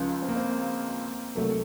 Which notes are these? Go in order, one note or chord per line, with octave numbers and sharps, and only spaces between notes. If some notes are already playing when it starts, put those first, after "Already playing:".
Already playing: C#2 C#3 F3
C4
A#3
C4
C2 C3 F#3 A3 A#3